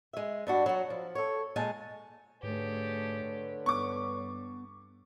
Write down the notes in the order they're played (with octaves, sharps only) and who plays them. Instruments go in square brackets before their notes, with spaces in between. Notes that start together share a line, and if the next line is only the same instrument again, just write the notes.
[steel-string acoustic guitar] G#3 E5
G2 D4 F#4
F#3 F#4
F3
A4 C#5
A#2 G#3 G#5 A5
[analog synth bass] G#2 [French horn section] D3 B4 C#5 [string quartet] A3 G4 G#4
[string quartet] G2 [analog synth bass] B3 [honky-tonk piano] C#6 D6